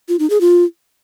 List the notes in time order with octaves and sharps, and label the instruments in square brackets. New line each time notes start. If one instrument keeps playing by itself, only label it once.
[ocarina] F4
D#4
G#4
F4